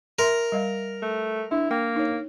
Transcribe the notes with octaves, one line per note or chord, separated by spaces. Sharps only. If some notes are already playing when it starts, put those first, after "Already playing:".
A#4 E5 C6
G3 D#5 F5
A3
D4 E4
A#3 G5
D#4 C#5